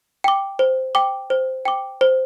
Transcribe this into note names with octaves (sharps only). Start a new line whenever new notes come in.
G5 D6
C5
G5 D6
C5
G5 D6
C5